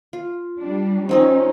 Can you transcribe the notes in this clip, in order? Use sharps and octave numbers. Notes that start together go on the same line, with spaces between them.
F4
G3 D4
F3 C4 C#4 D#4 D#5